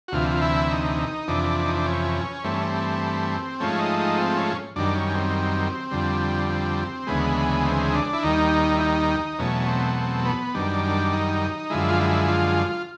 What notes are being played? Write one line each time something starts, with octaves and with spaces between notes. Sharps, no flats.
F#4
D2 C3 E3 F4
F4
E4
D#4
F2 C3 E3 D4
D#4
D4
C#4
G2 E3 A3 C4
C#4
C4
G#2 F3 A3 C#4
D#4
D#4
C4
C#4
F#2 D#3 G3 D4
C#4
C4
F2 D3 G3
C4
D2 C#3 E3 G#3 B3
C4
D#4
D4
E4
D#2 D#3 G3 D#4
E4
D#4
E2 B2 F#3 A3 C#4
C#4
C4
C4
B3
F#2 D#3 G3 D4
D4
D#4
F#2 D3 F3 G#3 E4
F4
E4
F4